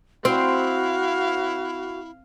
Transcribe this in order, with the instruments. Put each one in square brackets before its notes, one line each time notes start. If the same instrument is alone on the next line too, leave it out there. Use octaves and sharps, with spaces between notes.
[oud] C4 [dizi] E4 [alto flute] F#4 [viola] F5